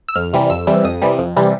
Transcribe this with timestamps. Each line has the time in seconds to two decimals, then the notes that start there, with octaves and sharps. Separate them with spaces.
0.09 E6
0.16 F2 F6
0.33 C3 E3 G3
0.50 F2 E6
0.67 C3 E3 G3
0.84 F2 D#6
1.02 C3 E3 G3
1.19 F2
1.36 C3 E3 G3